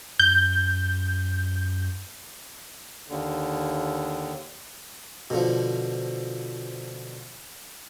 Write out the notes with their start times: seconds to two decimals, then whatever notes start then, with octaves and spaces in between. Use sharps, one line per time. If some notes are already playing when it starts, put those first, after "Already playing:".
0.20 F#2 G6
3.07 D#2 D3
5.30 B2 D3 F3